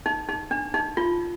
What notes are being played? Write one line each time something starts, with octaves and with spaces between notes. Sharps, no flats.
D#4
D#4
D4
D#4
F4